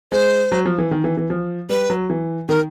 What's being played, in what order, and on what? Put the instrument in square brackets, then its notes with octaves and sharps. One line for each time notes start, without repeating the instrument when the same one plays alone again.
[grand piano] G#3 [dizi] C5
[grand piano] F#3
F3
E3
D#3
E3
E3
F3
[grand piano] G3 [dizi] B4
[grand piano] F#3
E3
[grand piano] D#3 [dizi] A#4